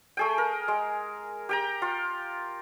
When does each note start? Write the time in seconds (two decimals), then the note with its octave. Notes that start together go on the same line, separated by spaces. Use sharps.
0.17 A3 G#4 G5
0.38 A#4
0.68 G#3
1.49 G4 G5 A#5
1.82 F4